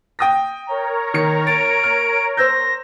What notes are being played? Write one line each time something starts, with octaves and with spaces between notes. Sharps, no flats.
G5 D#6 A#6
A#4 C#5 A#5
D#3 C#7
A6 D7
F6
C5 E6 G6 A#6